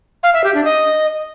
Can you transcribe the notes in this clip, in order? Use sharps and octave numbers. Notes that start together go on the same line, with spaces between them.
F5
E5
G4
D4
D#5